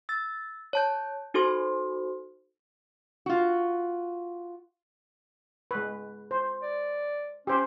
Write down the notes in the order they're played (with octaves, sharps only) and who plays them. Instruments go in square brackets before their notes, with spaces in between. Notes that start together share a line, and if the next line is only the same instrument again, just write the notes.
[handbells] E6 A6
C#5 A5 G6
D#4 F#4 A4 C5 C6
[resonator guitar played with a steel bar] F4 F#4
[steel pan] G#3 B4
C5
[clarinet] D5
[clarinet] C#4 [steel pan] G4 C5